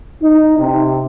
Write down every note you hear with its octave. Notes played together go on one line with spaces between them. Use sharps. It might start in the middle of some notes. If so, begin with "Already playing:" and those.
D#4
C3